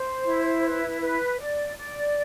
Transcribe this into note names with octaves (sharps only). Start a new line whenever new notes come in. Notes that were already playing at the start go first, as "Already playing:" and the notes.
Already playing: C5
E4
B4
B4
D5
D5